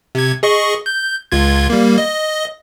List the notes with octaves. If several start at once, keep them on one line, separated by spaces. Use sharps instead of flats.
C3 G#6
G#4 D#5 C#6
G6
C#2 F4 G#6
G3 A#3
D#5